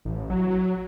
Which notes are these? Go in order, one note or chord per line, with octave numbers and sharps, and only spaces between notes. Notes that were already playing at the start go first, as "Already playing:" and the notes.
A1
F#3